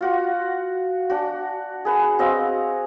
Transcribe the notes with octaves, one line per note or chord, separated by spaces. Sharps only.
F4 F#4 F#5
D4 F#4
G#4 B4 F#5
C4 F#4 D#5 F5